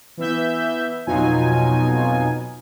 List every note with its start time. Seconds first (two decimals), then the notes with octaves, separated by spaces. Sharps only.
0.17 E3 B3 E5 G6
1.07 F2 B2 F#3 D#4 F4 G#5